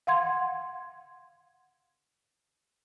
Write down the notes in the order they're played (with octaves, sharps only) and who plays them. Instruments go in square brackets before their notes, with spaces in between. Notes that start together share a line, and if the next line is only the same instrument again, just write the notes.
[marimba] F5 F#5 C6 G#6